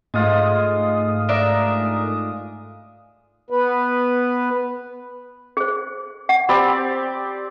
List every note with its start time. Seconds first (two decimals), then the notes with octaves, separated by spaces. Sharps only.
0.14 G#2 G#3 A3 F4 D#6
1.29 D4 A#4 E5
3.50 B3 B4
5.57 G#4 C5
6.29 F#5
6.49 C4 G4 D5 B5